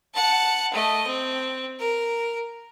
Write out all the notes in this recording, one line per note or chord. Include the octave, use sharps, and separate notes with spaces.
F#5 A5
A3 D#5
C4
A#4